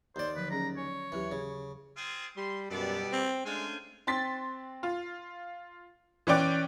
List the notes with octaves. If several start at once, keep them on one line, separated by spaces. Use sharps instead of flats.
D#2 C5 D5
D3 F3 F#3 B4
F#3 C#4 G#4 A#5
C#5 G#5
D#2 E3 F#3 G4
C#3
C4 F4 G#4
G3 C6
F#2 B2 G3 B3 A4 D5
C4
G#3 A3 C#4 D4 F4 C5 G#5
C4 C6 A6 B6
F4
E3 C#4 D5 G5 D6 F#6